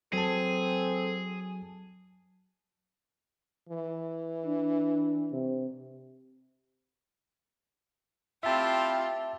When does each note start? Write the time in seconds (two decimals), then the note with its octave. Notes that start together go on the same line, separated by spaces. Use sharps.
0.13 F#3 C4 G#4 A4 A5
3.69 E3
4.46 D4
5.32 C3
8.43 C4 E4 F4 G4 E5 F5 A5